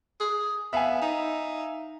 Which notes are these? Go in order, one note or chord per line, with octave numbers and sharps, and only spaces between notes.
G#4
B3 E5 F5 G#5
D#4